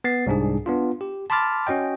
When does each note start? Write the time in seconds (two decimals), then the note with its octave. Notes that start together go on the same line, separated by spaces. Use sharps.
0.04 B3 A6 C7
0.26 C2 G#2 D4 G#4
0.66 B3 D4 F4
1.01 G4
1.30 A5 B5 C6 D6 F6 A6
1.67 C#4 F#4 D#5 G5